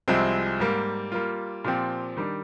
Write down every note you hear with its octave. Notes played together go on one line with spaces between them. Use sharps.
C2 C3 F3 G#3 C4
G#2 G3 A#3
G3 A#3 F4
A#2 F3 C4 G4
D#3 G3 D4